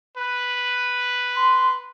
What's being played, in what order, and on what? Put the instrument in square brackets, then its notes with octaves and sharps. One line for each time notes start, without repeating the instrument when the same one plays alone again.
[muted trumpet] B4
[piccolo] C6